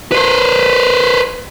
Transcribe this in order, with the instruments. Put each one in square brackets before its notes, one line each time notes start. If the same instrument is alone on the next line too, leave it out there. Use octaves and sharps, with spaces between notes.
[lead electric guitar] B4 C5